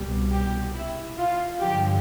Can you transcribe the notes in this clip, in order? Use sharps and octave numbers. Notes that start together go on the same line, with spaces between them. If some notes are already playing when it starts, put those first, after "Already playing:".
Already playing: C2 B2 G3
G4
E4
F4
G2 D3 F3 G4